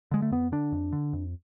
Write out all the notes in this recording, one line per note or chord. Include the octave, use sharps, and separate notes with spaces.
D3 G#3
A3
F2 B3
D3 D4
F2
D3
F2